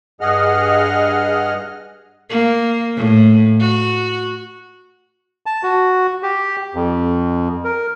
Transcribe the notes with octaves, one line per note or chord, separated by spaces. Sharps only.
G2 G#4 D#5 F#5 F6
A#3
A2
F#4
A5
F#4
G4
F2
A#4